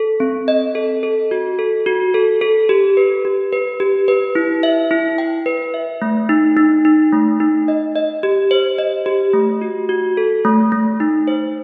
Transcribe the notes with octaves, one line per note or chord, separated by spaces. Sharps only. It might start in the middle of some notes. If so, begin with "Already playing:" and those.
Already playing: A4
C4
D#5
A4
A4
F#4
A4
F#4
A4
A4
G4
B4
G4
B4
G4
B4
E4
E5
E4
G5
B4
E5
A3
D#4
D#4
D#4
A3
D#4
D#5
D#5
G4
C5
D#5
G4
A3
F#4
F#4
A4
A3
A3
D#4
C5